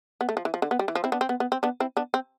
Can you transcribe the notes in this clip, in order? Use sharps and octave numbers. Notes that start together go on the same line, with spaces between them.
B3
A3
F3
E3
F3
D3
B3
G3
E3
F3
C4 E4
B3 D4
C4
B3
B3
C4
B3 D4
C4 E4
B3 D4
C4